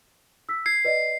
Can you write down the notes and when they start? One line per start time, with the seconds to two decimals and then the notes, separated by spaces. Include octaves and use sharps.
0.49 E6 B6
0.66 G#6 C7
0.85 B4 D5 D#5